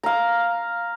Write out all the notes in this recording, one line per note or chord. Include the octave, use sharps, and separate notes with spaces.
F5 A#5